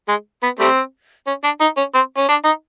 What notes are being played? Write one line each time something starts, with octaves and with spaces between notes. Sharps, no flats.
G#3
B3
G3 A3 C4
C#4
D4
D#4
C#4
C4
C#4
D4
D#4